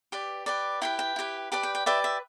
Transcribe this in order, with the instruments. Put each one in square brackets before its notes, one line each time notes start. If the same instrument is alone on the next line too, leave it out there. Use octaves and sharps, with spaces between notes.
[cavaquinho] G4 B4 D5
G4 B4 D5
E4 G4 B4 G5
G5
E4 G4 B4
G4 B4 D5 A5
G5
G5
G4 B4 D5 E5
E5